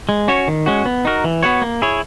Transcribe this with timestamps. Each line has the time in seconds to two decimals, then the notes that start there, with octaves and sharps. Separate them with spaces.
0.09 G#3
0.28 C#4 F#4 C#5
0.48 D#3
0.66 G#3 C#4 F#4
0.85 B3
1.05 D#4 F#4 A#4
1.24 E3
1.43 B3 F#4 C#5
1.62 A#3
1.82 E4 G#4 C#5